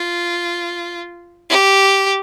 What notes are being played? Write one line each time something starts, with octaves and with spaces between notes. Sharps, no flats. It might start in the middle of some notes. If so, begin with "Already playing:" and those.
Already playing: F4
G4